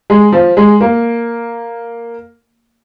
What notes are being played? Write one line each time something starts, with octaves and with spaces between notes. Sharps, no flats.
G#3
F3
G#3
A#3